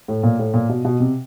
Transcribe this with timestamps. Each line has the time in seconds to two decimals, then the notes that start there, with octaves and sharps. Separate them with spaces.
0.08 A2
0.23 A#2
0.39 A2
0.54 A#2
0.69 B2
0.85 B2
1.00 C3